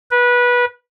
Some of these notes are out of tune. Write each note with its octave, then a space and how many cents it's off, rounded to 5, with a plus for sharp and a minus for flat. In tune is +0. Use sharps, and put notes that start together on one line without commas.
B4 -20